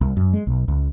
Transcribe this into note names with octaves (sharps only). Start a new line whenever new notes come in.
C2
F#2
G#3
B1
C#2